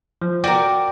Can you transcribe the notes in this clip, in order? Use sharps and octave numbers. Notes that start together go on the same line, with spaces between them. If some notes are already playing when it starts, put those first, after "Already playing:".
F3
F#4 A#4 D5 G5 D6